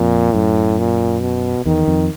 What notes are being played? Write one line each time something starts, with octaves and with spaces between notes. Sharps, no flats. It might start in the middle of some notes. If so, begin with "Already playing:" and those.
Already playing: F2 A#2
F#2 A2
A#2
B2
E2 D#3
F2